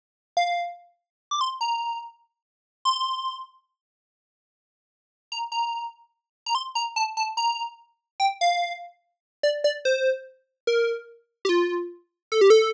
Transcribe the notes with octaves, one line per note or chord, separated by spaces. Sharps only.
F5
D6
C6
A#5
C6
A#5
A#5
A#5
C6
A#5
A5
A5
A#5
G5
F5
D5
D5
C5
A#4
G4
F4
A4
G4
A4